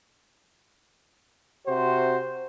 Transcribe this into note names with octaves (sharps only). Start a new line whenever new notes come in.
C3 F#4 C5